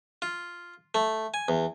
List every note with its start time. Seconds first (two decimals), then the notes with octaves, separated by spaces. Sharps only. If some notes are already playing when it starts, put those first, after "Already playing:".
0.22 F4
0.95 A3
1.34 G#5
1.48 E2